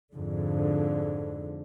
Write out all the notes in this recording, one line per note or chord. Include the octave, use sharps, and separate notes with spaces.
F2 G#2 D3